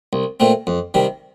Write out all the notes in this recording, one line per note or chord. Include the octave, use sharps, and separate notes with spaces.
C2
A#2 A3 C4
F2
C3 D#3 G3